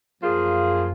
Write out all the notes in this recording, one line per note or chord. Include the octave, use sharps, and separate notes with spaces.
F#2 F3 A#3 F4 G#4